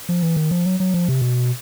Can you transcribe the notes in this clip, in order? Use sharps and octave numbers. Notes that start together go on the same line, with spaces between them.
F3
E3
D#3
F3
F#3
F#3
F3
C3
B2